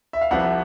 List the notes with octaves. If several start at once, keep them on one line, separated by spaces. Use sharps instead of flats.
E5
F5
C2 C3 F3 E5 F#5